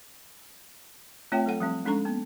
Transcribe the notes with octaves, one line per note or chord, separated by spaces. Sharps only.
A3 C4 F4 C#5 E5 G5
F#3 A4 F#5
F3 G3 C4
G#3 C#4 D4 A4 A#5 C#6
A#3 B3